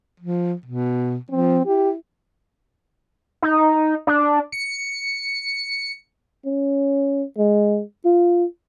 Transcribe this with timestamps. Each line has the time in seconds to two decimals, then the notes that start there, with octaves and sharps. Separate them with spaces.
0.20 F3
0.66 B2
1.31 F3 C4
1.66 E4 G4
3.42 D#4
4.07 D4
4.52 C#7
6.46 C#4
7.37 G#3
8.05 F4